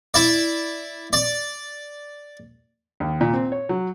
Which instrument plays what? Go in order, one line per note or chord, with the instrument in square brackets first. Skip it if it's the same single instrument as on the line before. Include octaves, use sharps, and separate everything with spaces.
[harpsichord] E4 D5
D5
[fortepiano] D#2
A#2
C4
C#5
F#3